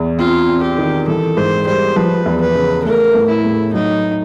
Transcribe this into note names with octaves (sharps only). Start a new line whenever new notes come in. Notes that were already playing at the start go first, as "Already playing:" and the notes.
Already playing: E2
C4 F4
C4
G4
D#3
E3 A4
G#2 C5
G3 C5
F3 B4
E2
B4
C#3
A3 A#4
A2
E4
A2
F#3 D#4